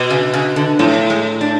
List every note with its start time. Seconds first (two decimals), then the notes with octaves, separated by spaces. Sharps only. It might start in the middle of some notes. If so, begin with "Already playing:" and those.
Already playing: B2
0.10 C#3
0.34 C#3
0.56 D3
0.79 A2 F3
1.10 G#3
1.41 D4